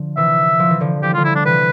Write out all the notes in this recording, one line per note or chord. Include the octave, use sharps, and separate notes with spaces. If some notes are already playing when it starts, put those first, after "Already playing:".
Already playing: D3 F3
C3 E3 E5
F3
E3
D3 F3
F3 G4
G3 F4
D3 F3
E4
D4
C3 E3 B4